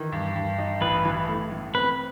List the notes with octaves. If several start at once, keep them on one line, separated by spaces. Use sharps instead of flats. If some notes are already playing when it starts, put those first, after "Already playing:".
Already playing: D#3 E3
G2
G2
D#4
A1 B4
E3
A3
A2
C4 B4